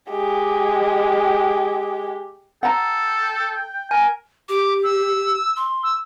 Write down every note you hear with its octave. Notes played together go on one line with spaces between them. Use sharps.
G#3 G4
A4 F#5 G5 A#5
A#4 G#5
G4 D6
E6
C6
E6